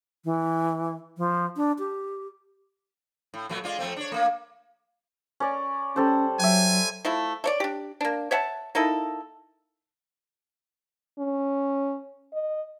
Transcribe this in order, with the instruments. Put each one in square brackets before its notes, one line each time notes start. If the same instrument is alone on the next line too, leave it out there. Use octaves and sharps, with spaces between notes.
[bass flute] E3
F3
D4
G4
[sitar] A2
A#2 F#3 A3
G#3 F4 D5
F2 A3 C4
D4 C#5
A3 A#3
[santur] C#4 A#4 D5
[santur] G3 A4 C5 [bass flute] C#4
[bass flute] F#3 [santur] E5 G5 [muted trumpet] G#5
[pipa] F3 A3 E4
A3 C#5 D5
D4 G4
A#3 D4
C#5 E5 F#5 A5
A#3 D#4 E4 A4
[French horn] C#4
D#5